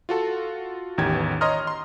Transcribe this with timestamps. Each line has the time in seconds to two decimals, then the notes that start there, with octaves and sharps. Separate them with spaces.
0.09 F4 F#4 A4
0.98 A1 E2 D#3 G4 G#6
1.41 C#5 D#5 A#5 C6 D#6 F6
1.67 C6